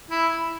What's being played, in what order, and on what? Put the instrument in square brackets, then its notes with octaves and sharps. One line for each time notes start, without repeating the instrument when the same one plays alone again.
[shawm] E4